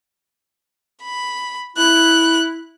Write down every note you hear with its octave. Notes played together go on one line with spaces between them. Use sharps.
B5
E4 F#6